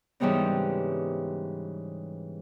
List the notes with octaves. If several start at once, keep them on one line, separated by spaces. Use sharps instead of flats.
G#2 C#3 E3 G3 B3 C4